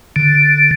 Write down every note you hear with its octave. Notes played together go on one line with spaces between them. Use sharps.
D3